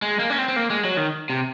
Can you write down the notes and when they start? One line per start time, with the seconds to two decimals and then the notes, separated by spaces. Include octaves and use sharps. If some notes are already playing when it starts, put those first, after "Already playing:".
0.02 G#3
0.19 A#3
0.30 C#4
0.38 C4
0.49 C4
0.56 A#3
0.70 G#3
0.84 F#3
0.97 D#3
1.30 C3